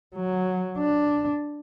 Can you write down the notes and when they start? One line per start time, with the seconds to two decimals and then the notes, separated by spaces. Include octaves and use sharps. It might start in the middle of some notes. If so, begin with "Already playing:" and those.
0.16 F#3
0.78 D4